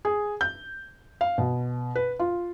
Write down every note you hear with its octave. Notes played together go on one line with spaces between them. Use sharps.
G#4
G6
F5
B2
B4
F4